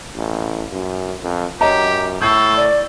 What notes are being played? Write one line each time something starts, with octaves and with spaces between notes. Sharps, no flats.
A1
F#2
F2
F#2 G4 C#5 D#5 A#5
A2 A4 C#6 G6 C7
D5